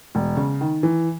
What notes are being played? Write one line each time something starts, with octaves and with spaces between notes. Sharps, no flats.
E1
C#3
D#3
E3